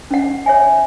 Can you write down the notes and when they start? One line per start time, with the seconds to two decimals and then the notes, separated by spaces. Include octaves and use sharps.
0.11 C#4 F#5
0.46 C#5 E5 G#5